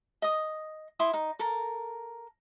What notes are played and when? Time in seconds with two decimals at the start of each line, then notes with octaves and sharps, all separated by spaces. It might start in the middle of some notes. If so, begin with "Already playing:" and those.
0.22 D#5 D#6
0.99 E4 C6 D#6
1.13 D#4
1.39 A4 A#4